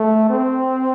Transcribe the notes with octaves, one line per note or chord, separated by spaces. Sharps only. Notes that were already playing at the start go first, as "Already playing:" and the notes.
Already playing: A3
C4